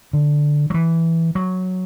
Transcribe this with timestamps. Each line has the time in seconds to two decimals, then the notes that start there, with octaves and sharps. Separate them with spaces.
0.13 D3
0.70 F#3
0.74 E3
1.35 F#3